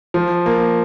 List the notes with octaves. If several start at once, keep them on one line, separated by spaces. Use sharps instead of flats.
F3
A#3